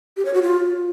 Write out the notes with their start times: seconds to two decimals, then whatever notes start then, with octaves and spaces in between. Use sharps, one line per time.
0.17 G4
0.25 C#5
0.34 F#4
0.42 F4